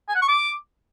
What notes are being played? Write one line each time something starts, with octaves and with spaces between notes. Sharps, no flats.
G#5
F#5
C#6
D6